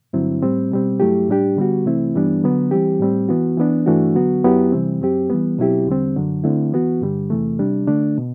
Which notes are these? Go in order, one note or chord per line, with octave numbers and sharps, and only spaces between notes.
G2 D3 F#3 C4 E4
A2 G3 C4
B2 G3 C4
G2 F#3 A3 E4 G4
A2 G3 D4 G4
D3 G3 B3 F#4
C3 E3 A3 C4 E4
G2 E3 G3 B3 D4
D3 F#3 B3
E3 G3 C4 G4
A2 G3 C4
E3 B3 F#4
E3 B3 D4
G2 E3 A3 D4 F#4
D3 F#3 B3 F#4
F#2 F#3 B3 E4 G4
C3 E3 G3 C4
F#2 F#3 C4 G4
E3 G3 B3
B2 F#3 C4 E4 G4
E2 D3 G3 C4
F#2 D3 F#3
D3 A3 C4 E4
E3 B3 F#4
G2 D3 G3
E2 C3 E3 A3
C3 G3 D4
D3 A3 D4
B2